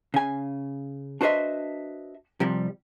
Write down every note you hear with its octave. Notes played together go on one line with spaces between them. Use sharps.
C#3 G#5
D4 F#4 B4 C5 D#5 E5
C3 F3 G3